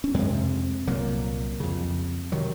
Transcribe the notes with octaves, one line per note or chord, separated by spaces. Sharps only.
C#4
F2 C3 G#3 C4
C2 A#2 F#3 A#3
F2 C#3
C3 D#3 F#3